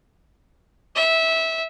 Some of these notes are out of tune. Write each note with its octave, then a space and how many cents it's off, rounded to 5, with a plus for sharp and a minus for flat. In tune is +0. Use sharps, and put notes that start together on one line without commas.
E5 -15